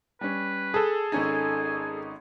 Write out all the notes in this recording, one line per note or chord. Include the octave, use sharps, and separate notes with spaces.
G3 C#4 B4
G#4 A4 A5
G#1 C#4 D#4 G#5